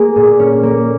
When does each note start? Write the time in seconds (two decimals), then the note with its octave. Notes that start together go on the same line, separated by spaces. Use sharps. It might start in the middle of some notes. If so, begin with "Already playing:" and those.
Already playing: A#3 G#4
0.16 A#2
0.39 C#4
0.63 A#3